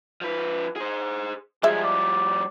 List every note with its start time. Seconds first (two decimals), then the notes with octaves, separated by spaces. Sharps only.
0.21 F3 B4
0.76 G#4 C5
1.63 F3 G3 G#3 G#4 E5
1.84 D5